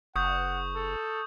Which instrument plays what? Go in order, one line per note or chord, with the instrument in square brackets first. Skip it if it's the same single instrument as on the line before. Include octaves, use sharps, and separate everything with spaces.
[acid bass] F#1 [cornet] F#5 [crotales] C#6 D#6 G6
[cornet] A4